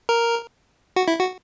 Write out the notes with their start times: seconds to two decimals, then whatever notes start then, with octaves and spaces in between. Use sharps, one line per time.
0.09 A#4
0.96 F#4
1.08 E4
1.20 F#4